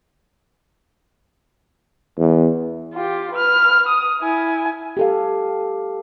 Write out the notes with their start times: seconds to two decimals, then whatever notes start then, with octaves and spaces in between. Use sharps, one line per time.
2.18 E2
2.94 F4 G4
3.33 B4 F6
3.88 D#6
4.21 E4 G#5
4.97 G4 A4 F5